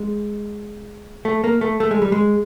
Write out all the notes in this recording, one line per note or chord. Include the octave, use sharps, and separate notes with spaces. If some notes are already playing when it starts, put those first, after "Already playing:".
Already playing: G#3
A3
A#3
A3
A3
G#3
G3
G#3